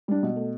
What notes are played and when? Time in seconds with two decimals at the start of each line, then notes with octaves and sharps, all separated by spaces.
0.08 G3 D4
0.23 B2
0.36 A3